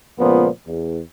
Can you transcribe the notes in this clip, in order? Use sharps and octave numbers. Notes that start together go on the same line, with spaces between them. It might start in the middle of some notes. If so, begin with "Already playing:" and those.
C#2 A#2 F3 B3
E2